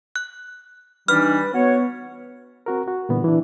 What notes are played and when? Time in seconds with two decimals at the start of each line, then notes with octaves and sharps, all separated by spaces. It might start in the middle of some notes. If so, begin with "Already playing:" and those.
0.16 F#6
1.08 E3 G3 D4 D#4 B4 F6
1.54 B3 F#4 C#5
2.66 C4 F#4 A#4
2.88 F#4
3.09 A#2 D3 E3 G3 B3
3.24 E3 D4